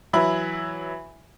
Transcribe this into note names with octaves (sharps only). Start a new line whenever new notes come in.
E3 F#3 E5 B5